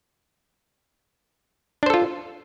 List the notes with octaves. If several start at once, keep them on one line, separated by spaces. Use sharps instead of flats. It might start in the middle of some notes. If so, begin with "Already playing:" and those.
D4 F4 A4 C5